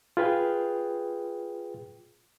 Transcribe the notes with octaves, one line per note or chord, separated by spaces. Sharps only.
F4 G#4 B4 G5